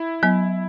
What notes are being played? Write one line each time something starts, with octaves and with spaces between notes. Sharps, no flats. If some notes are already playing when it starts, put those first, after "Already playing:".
Already playing: E4
F#3 B3